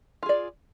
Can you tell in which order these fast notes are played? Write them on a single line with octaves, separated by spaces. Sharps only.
F4 G#4 D5